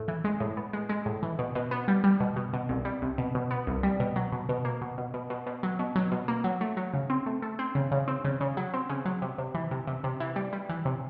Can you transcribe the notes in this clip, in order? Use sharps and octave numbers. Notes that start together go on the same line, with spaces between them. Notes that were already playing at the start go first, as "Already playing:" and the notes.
Already playing: A2
E3
G#3
A2
B3
G#3
G#3
A2
E3
B2
B2
B3
G3
G3
B2
B2
B2
C2
G3
C2
B2
B2
B3
C2
G3
B2
F#3
B2
B2
A#3
B2
B2
B2
B2
B2
F#3
B2
F#3
B2
A#3
F#3
A3
F#3
C#3
C4
A3
A3
C4
C#3
C#3
C4
C#3
C#3
F#3
C4
C#3
F#3
C3
C3
E3
C3
C3
C3
E3
G3
G3
E3
C3